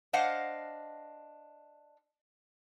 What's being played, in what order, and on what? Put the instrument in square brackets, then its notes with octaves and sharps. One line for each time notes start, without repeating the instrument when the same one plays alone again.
[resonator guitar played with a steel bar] D4 C5 D#5 F5 F#5